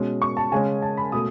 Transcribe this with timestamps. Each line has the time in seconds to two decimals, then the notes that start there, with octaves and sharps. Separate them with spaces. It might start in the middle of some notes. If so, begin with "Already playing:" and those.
Already playing: B2 G#3 C#4
0.22 C#6
0.37 A5
0.52 C#3 G#3 C#4 G#5
0.82 A5
0.97 B5
1.12 B2 A3 D#6